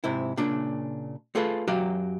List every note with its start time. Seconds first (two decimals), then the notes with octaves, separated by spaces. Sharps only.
0.04 G#2 C3 E4
0.37 A#2 C#3 D4
1.35 A3 F4 G#4 A4 B4
1.68 F#2 F#3 F#4 G4 F5